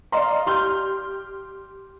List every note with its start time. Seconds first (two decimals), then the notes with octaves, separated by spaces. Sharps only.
0.12 D5 D#5 F5 A#5 C6
0.46 G4 C6 F6 G6